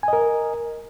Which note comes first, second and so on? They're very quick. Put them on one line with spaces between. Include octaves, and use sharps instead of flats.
G#5 D#5 A#4